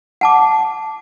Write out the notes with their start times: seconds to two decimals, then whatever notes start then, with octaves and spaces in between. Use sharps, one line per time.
0.21 F#5 A5 D6